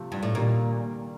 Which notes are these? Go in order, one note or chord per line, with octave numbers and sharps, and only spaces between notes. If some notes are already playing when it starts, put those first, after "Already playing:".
Already playing: C3 F3 A3
G2
A2
A#2 D#3 G3 A#3